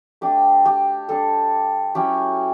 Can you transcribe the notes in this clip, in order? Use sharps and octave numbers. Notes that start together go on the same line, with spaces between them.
A3 D4 G4
G4
G3 D4 A4
F#3 C#4 E4 G4